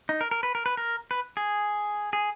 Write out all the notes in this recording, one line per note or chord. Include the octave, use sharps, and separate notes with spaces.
D#4
A#4
A#4
B4
A#4
B4
A#4
B4
G#4
G#4